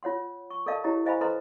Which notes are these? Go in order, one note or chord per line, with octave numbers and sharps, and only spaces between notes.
F4 C#5 F#5 C6
C#6
A4 A#4 D5 D#5 F5 A5
E4 G4 C#5 D#5 A#5
C5 D#5 F5 G#5 A#5 B5
A4 B4 C5 D#5 A#5 C6